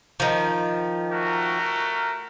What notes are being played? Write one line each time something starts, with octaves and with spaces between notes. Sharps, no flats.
D#3 F3
A3 F#4 A#4